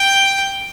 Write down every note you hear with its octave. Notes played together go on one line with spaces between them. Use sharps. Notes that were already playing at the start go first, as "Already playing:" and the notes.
Already playing: G5